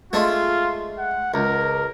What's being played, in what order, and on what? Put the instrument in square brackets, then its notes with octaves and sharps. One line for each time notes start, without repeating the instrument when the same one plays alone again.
[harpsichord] G#3 A3 D4 [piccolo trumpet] F4
[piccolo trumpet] F#5
[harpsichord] C#2 [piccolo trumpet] A#4